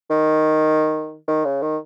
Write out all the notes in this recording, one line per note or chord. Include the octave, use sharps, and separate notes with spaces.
D#3
D#3
C#3
D#3